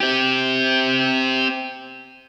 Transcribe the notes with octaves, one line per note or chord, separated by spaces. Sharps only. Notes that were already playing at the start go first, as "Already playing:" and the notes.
C4 G4